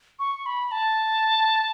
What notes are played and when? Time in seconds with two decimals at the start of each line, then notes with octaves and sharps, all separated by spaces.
0.19 C#6
0.46 B5
0.72 A5